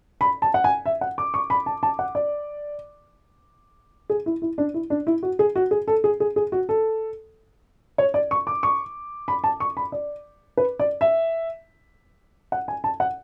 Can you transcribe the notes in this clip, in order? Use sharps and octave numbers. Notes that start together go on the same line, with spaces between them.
B5
A5
F#5
G#5
E5
F#5
D6
C#6
B5
A5
A5
F#5
D5
G#4
E4
E4
D4
E4
D4
E4
F#4
G#4
F#4
G#4
A4
G#4
G#4
G#4
F#4
A4
C#5
D5
C#6
D6
C#6
B5
A5
C#6
B5
D5
B4
D5
E5
F#5
G#5
A5
F#5